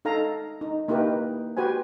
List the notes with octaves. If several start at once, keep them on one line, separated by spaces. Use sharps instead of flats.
D#4 A4 F5 A#5
D#4
A#3 D#4 E4 G4 A#4 B4
F#4 G4 B4 C5 G#5